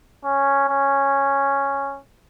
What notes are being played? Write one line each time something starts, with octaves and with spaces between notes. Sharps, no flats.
C#4
C#4